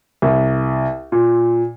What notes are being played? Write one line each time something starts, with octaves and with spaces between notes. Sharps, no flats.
C2
A#2